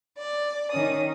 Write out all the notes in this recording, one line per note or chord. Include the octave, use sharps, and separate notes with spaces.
D5
D#3 C#4 D#6